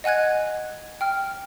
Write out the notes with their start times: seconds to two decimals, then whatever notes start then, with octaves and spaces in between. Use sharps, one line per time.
0.04 D#5 F#5 G#5 F#6 G#6
1.01 G5 F6